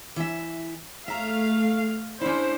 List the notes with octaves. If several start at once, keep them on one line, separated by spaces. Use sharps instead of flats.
E3 E5
A3 E5 F5 A#5
C#4 D4 E4 C5